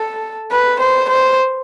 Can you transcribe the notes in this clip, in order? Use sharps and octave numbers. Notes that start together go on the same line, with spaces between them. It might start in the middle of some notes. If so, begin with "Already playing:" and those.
Already playing: A4
B4
C5
C5